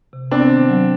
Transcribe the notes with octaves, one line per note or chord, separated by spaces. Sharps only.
C3
B3 C4 D4
D#3
F#3